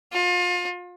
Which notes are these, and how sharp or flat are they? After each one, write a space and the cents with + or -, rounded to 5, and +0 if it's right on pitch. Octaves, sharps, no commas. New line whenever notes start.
F4 +35